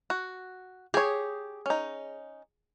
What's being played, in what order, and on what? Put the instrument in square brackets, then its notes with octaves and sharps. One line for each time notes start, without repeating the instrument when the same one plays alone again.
[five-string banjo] F#4
[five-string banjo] G4 C#5 [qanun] G#4
[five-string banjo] C#4 D#4